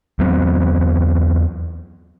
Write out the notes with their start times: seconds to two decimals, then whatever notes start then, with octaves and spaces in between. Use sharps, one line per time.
0.19 E2 F#3 B3 C4